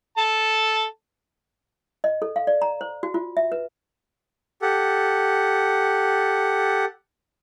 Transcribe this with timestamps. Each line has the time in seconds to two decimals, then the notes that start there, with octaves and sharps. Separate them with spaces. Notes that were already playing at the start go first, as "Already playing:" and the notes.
0.18 A4 A5
2.04 D#5
2.22 A4
2.36 F5
2.47 D5
2.62 A#5
2.81 C5
3.03 F#4
3.14 F4
3.37 E5
3.52 B4
4.62 G4 A4 F#5